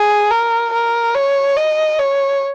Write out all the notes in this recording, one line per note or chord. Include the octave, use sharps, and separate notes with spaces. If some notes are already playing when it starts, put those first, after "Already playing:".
Already playing: G#4
A#4
A#4
C#5
D#5
C#5